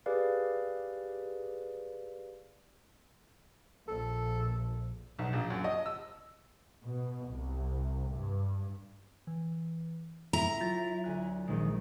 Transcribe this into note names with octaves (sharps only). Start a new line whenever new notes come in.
G4 G#4 B4 D5 F5
A#1 A#2 A4
B1
A#1
F#2
D#5
E6
B2
C2
G2
E3
E4 A4 G5 A#5
F#3 F4 G6 A6
D2 G#5 F#6
A#1 D#3 G#3